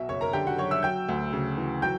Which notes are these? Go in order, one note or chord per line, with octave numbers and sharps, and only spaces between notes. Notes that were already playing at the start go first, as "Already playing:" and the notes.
Already playing: B1 B2 E5
F#1 C#5 C#6
A#4 A#5
D3 G4 G5
F#4 F#5
F#3 C#5 C#6
E5 E6
F#3 G5 G6
D2
C#3
E3
F#3 G5 G6